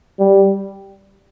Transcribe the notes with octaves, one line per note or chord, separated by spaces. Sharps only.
G3